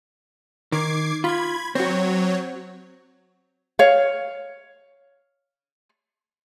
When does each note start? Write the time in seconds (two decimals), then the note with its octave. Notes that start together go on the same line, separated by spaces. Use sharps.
0.72 D#3 D6 G#6 C7
1.24 F4 B5 G#6
1.75 F#3 C4 F#4 C#5
3.79 C#5 F5